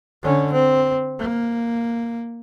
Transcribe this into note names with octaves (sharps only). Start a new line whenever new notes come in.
D3 C#4
C4
A#3